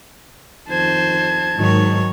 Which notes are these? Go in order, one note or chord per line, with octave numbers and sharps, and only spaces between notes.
F2 D#3 C5 A5 G#6
G#2 D#3 F#3 C#5